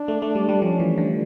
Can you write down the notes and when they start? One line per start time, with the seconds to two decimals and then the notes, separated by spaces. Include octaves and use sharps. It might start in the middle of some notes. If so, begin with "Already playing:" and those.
Already playing: D4
0.08 A3
0.22 A3
0.35 G3
0.49 G3
0.62 F3 C#4
0.80 E3
0.98 D3